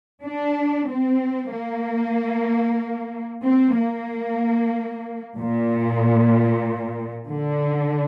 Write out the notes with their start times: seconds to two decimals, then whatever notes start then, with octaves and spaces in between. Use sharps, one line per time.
0.24 D4
0.89 C4
1.52 A#3
3.44 C4
3.76 A#3
5.37 A#2
7.28 D3